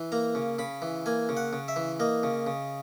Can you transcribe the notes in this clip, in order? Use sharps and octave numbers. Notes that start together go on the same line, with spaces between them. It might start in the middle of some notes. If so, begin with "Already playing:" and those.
Already playing: E3
A#3 A#5
C#3
C#3 B5
E3
A#3 G#5
C#3
F#5
C#3
E5
E3
A#3 D#5
C#3
C#3